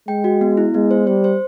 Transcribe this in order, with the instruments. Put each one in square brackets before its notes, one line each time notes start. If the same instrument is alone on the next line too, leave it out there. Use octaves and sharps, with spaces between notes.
[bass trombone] G#3 [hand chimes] G5
[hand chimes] F#4
B3
E4
[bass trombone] G#3 [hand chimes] B3
[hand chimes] C5
[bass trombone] G3 [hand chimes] C5
[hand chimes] C5